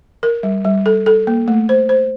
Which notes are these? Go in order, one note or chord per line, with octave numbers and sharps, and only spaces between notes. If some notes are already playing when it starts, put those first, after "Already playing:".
A#4
G3
G3
A4
A4
A#3
A3
C5
C5